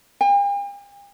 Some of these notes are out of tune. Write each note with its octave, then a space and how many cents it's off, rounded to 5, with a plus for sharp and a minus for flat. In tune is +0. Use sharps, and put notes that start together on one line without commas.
G5 +45